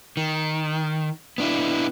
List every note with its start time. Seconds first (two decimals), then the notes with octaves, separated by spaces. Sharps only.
0.17 D#3
1.38 B3 D4 E4